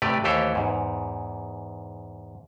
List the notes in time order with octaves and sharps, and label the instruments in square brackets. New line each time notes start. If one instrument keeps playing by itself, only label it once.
[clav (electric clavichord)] A2 C3 A3 G4 B4 D5
D#2 E3 A3 G4 C5 C#5
E2 G#2